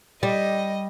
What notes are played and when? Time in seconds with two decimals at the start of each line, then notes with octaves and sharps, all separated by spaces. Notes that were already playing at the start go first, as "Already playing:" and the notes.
0.23 G3 D#5